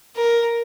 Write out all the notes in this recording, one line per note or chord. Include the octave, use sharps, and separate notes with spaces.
A#4